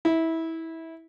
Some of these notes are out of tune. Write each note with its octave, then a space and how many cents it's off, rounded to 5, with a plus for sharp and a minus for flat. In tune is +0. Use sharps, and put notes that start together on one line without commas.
E4 -20